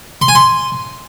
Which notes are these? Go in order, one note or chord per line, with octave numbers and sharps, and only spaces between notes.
C6
G#5
C6